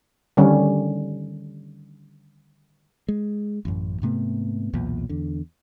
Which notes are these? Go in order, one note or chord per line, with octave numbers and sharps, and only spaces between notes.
D3 D#3 G3 C#4
G#3
A1 F#2
G#2 C3 A3 B3
B1 E2 A#2
E2 D3